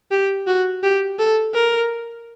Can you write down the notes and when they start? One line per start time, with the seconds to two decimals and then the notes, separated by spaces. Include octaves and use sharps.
0.11 G4
0.47 F#4
0.83 G4
1.19 A4
1.54 A#4